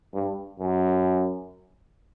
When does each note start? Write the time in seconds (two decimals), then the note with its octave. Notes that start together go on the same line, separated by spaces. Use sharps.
0.14 G2
0.60 F#2